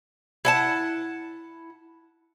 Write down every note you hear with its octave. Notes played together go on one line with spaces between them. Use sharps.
E4 F#5 A5